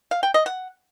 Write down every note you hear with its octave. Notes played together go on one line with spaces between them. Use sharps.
F5
G5
D#5
F#5